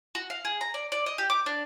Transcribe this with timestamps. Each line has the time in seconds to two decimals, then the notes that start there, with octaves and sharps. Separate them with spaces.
0.15 F#4
0.30 F5
0.45 G#4
0.61 A#5
0.74 D5
0.92 D5
1.06 D#5
1.18 G4
1.30 D6
1.46 D4